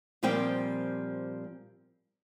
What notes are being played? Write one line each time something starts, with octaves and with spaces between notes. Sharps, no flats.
A#2 F3 G3 C4 G4 G5